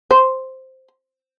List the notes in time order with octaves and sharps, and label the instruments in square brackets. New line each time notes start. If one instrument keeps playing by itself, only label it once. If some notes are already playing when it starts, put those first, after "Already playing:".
[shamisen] C5